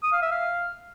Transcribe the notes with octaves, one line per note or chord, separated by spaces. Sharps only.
D#6
F5
E5
F5